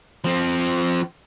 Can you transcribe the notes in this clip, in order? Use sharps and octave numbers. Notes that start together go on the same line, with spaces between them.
F3 C4